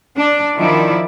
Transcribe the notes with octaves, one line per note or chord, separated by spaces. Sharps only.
D4 D5
D#3 F3 E4 D5